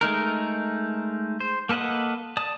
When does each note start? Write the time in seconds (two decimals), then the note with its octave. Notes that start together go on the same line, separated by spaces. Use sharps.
0.01 G#3 A3 D#4 A#4
1.40 C5
1.69 A#3 A4 B4 D#5 F#5
2.37 D5 A5 D#6